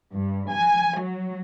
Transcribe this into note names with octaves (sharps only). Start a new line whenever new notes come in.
G2
G#5
F#3